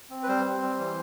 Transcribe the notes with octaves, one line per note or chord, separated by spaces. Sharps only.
C4
B4
G3 C5
C4
G3
E3